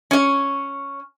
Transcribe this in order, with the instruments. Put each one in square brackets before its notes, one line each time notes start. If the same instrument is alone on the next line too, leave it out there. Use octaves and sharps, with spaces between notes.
[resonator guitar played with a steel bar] C#4 C#5